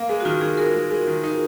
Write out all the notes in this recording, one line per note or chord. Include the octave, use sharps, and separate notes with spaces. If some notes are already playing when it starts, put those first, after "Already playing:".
Already playing: A#3
G#3
F#4
D#3 F4
D#3 G#4
G#3 A#4
G#3
G#3
D#3
D#4